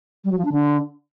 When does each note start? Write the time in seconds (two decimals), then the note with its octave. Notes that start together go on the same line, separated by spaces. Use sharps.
0.24 G3
0.31 F#3
0.38 F3
0.45 D4
0.52 D3